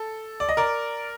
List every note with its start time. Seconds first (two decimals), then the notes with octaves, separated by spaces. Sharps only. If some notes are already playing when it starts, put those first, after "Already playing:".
Already playing: A4
0.40 D5
0.49 D#5
0.57 A#4 D5